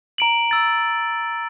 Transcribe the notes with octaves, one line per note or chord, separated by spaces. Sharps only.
A#5 D7 F#7
E6 A6